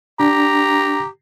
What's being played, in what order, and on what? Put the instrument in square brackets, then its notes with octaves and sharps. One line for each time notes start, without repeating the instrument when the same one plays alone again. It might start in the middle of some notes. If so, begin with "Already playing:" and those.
[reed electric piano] D4 [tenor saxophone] G4 [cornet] A#5